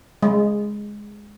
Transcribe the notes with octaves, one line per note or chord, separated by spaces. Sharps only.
G#3